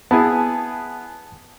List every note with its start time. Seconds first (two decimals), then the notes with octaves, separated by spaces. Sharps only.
0.11 B3 E4 G#4 G#5 A5